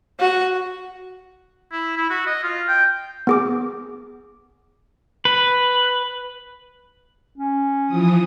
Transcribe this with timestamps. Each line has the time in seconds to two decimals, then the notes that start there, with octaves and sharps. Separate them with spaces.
0.20 F#4
1.72 E4
1.97 E4
2.10 F#4
2.27 D#5
2.43 F4
2.68 G5
3.27 B3 G#4 D6
5.25 B4
7.38 C#4
7.86 E3 F3 D#6